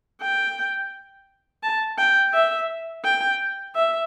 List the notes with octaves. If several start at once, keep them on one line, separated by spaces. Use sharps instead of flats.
G5
A5
G5
E5
G5
E5